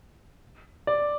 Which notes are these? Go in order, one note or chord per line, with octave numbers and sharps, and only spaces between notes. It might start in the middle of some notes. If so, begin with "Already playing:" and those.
D5